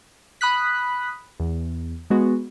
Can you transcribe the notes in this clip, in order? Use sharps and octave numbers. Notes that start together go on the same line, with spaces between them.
B5 D#6 F#6 B6
E2
G#3 B3 F#4